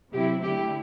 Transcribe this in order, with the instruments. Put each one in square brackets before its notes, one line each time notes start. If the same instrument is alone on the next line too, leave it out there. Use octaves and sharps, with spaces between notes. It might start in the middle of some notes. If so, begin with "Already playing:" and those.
[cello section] C3 F#3 C4 E4 G4
D3 A3 E4 G4